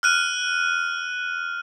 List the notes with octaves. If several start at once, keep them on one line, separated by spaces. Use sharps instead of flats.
F6 F#6 D#7